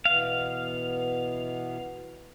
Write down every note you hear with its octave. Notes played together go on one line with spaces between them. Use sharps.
B2 E3 B3 F5